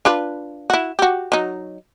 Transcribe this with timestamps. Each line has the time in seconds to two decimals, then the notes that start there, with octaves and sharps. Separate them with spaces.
0.05 D4 F4 B4
0.70 E4 F#4
0.99 F#4 G4
1.32 F#3 D#4